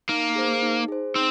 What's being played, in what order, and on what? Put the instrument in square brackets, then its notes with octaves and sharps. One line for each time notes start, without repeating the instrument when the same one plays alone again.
[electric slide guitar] A#3 [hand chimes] D#4
[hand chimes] G#4 C5
D#4
G#4 C5
[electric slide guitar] C4 [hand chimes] D#4